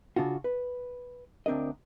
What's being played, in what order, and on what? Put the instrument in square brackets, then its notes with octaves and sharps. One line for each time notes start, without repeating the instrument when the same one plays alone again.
[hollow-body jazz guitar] C#3 D4 F4 F#4
B4
D2 C4 D4 A#4 D#5